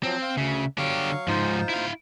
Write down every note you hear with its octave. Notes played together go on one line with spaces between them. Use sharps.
F3 F#3 C4
F5
D2 C#3 E5
D3 F#3 G4 F5 C#6
G#2 F3 D#4 F4 C5
E4 F5